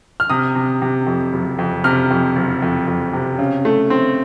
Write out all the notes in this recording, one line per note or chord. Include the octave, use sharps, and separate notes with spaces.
F6
C3 D#6
C3
C3
F2
F#1
F2
C3 F6
F2
F#1
F2
F2
C3
C#3
A3
C4